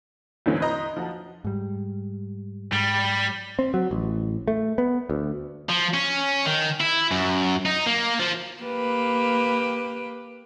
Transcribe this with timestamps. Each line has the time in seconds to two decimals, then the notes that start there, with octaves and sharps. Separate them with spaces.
0.46 E2 A2 D3 E3 F#3 C4
0.60 B4 C5 D#5 A#5
0.97 F3 F#4 A5
1.44 G#2 G3
2.72 G#2 G3
3.59 C4
3.74 F#3
3.91 A1
4.48 A3
4.78 B3
5.10 D2
5.69 F3
5.94 C#4
6.45 D#3
6.80 E4
7.11 F#2
7.66 D#4
7.87 A#3
8.20 F3
8.63 A#3 G4 B4